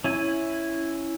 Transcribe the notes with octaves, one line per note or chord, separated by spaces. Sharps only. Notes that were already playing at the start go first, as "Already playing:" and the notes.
C#4 E4 G#5